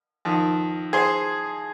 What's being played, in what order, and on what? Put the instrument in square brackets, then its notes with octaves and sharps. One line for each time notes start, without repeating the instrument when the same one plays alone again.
[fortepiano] F2 D#3
G#4 C5